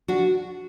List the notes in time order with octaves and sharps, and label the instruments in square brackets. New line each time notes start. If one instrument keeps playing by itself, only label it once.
[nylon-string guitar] D4 F#4